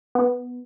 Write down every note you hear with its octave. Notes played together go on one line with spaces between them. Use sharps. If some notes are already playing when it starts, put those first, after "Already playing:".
B3